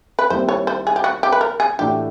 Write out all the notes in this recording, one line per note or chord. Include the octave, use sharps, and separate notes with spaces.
B4
D#2 D#3 G3 C4 E4 C5
C#5
C5
G#4
G4
F#4
G4
B4
A#4
G#4
A2 E3 A3 D4 F#4 G4